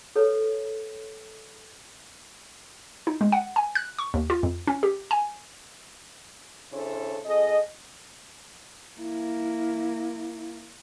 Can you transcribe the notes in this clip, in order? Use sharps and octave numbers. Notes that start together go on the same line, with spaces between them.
A4 B4 C#5
D#4
G#3
F#5
G#5
F#6
C#6
D#2
F4
F2
C#4
G4
G#5
C#3 D4 E4 A4 C5 C#5
F2 G#4 A4 D#5
A#3 E4